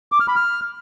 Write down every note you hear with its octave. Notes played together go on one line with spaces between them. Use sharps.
D6
F6
B5
F6